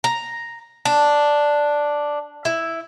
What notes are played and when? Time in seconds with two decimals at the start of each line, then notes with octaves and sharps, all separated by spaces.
0.04 A#5
0.85 D4
2.45 E4